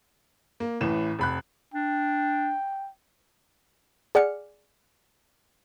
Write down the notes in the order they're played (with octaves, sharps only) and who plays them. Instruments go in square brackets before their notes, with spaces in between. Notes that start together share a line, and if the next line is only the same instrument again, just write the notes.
[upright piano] A#3
A1 A2 E3 E7
F1 B5 F#6
[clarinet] D4 [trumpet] G5
[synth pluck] G#4 D5 F#5 F6 C#7